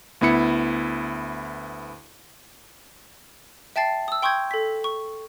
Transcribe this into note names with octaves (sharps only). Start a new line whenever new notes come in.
D2 B3 E4 C#7
E5 G5 A5 A6 C7
D#6 E6
G5 C6 C#6 D#6 G6 G#6
A4 B6
C#6